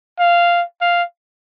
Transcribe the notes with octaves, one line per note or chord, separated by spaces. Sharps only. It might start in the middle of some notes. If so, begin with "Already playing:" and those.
F5
F5